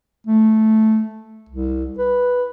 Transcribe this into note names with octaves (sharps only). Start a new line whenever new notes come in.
A3
C2
B4